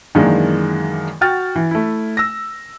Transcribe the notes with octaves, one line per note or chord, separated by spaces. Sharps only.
F#2 D#3 E3 G#3 A#3 D4
F#4 F#5 G5 F6 A6
E3
A3 E4
E6 A#6